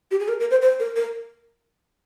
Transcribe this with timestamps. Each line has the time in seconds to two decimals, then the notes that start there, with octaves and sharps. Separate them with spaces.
0.11 G4
0.20 G#4
0.28 A#4
0.40 A#4
0.51 C5
0.62 C5
0.80 A#4
0.96 A#4